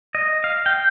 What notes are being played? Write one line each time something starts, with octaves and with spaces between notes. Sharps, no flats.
D#5
F5
G5